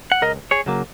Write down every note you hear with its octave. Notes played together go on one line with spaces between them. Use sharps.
F#5
C#2 A#4 D#5
G#4 C#5
C#3 F#3 A#3